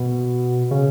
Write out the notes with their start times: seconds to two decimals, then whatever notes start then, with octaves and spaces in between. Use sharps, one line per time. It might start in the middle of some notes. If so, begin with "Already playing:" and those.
Already playing: B2
0.71 C#3